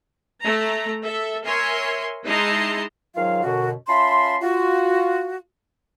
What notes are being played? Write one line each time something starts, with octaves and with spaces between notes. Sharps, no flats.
A3 A#5
A4 E5
A#4 C#5 E5 G#5 C6
G#3 D#4 E4 A5 A#5 C6
G#2 D#3 F#3 F4 F5
F#2 B2 D3 F#4
C#4 F4 E5 A5 B5 C6
F4 F#4